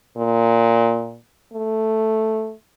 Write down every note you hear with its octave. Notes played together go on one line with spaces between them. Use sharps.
A#2
A3